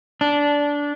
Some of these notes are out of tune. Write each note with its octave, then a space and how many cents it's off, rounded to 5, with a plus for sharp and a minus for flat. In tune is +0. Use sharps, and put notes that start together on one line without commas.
D4 -15